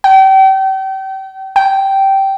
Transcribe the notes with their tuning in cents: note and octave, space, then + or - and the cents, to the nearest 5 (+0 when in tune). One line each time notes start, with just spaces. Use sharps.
G5 -35
G5 -10